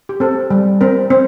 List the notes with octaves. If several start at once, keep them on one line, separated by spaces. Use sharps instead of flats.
G4
C4 A4
G3
C4 A#4
C4